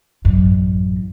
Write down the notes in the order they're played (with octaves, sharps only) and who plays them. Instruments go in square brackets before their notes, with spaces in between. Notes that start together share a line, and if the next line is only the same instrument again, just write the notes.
[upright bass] A1 F#2